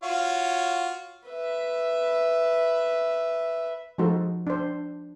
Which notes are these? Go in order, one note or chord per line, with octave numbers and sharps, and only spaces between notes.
F4 F#4 C#5
B4 E5
F3 G#3 D#4 F#4 A4 C5
D4 C5